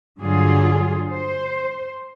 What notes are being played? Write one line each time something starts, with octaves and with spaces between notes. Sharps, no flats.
G2 D3 F#3 F4 G#4
C5